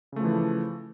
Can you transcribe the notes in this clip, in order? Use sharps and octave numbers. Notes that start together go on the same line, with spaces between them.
C#3 E3 F3 A3